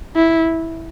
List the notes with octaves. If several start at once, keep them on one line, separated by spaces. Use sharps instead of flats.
E4